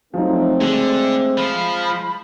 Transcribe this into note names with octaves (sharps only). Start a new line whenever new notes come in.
F3 F#3 A3 C4 D#4
D3 G#3
F3 B5